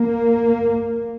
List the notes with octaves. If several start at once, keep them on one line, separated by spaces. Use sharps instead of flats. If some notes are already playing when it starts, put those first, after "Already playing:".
Already playing: A#3